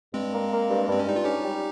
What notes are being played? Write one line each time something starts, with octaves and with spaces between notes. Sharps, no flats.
G2 G#3 C4
A#3
A#3
G2
G2 C4
C#4
G2 D#4
F4
C#4 D#4 G4
G3